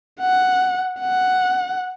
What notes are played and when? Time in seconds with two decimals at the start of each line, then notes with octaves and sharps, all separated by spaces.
0.20 F#5
1.01 F#5